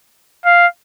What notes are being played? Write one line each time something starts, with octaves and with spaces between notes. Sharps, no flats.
F5